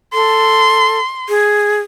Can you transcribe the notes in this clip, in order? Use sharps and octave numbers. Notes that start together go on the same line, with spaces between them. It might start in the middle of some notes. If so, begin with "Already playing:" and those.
A4 C6
G#4